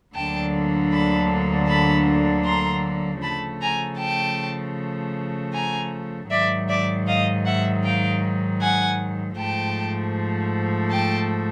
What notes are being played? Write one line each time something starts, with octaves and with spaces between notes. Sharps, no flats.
D2 D3 F#3 A#3 D4 G5 A5
A5 B5
A5 B5
A#5 C6
C#3 F3 A3 A5 B5
G#5 A#5
G5 A5
G#5 A#5
G#2 D#3 F#3 D5 E5
D5 E5
D#5 F5
E5 F#5
F5 G5
F#5 G#5
G#2 F3 A3 G5 A5
G5 A5